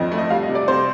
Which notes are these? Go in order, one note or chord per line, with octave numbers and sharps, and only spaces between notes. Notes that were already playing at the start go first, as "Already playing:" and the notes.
Already playing: F2 D3 C4 D#5
A3
D#5
G3 F5
D#5
C3
D5
C3 C5